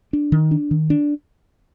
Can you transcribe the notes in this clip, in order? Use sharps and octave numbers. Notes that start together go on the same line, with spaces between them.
D4
D#3
D4
D#3
D4